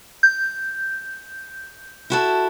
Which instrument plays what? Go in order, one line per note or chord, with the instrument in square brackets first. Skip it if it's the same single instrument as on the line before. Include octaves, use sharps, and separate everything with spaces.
[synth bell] G6
[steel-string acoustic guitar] E4 F#4 A4